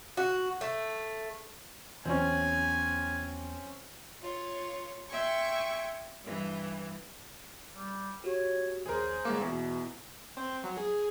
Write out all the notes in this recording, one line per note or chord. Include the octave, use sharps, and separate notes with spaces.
F#4
A3
E2 F#3 C4 C#4 G#5
F4 C#5
E5 G5 G#5 C6 C#6
G2 E3
G3
F#4 G4 C#5
A#1 D#2 G#4 A#4 C5
G1 G#3 A#3 F5 D6
E2 B2 B3 E4
C4
F#3
G#4